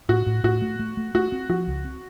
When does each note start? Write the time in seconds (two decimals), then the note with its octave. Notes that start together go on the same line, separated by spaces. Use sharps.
0.09 A2 F#4
0.26 A2
0.44 A2 F#4
0.62 A3
0.79 A3
0.97 A3
1.14 A3 F#4
1.32 C4
1.49 F3 F#4
1.67 C#2
1.85 C4